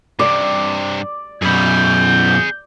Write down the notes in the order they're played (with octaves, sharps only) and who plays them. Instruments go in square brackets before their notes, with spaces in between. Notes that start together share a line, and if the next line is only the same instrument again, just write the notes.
[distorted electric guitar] G2 C3 [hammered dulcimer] D5
[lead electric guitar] F#2 B2 [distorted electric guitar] G#4 B5 [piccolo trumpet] G6